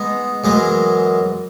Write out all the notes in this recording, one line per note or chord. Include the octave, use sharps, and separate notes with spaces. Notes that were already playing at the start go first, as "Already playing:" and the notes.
Already playing: G#3 B3 D#4
F#2 E3 G#3